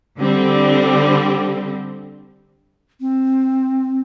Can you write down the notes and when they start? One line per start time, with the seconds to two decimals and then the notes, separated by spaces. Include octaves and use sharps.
0.19 D3 G3 C4
3.01 C4